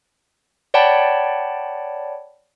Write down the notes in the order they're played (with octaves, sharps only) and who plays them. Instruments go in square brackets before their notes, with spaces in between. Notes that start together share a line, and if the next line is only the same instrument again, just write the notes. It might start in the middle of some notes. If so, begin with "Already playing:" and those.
[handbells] C#5 D5 F#5 G5 A5 B5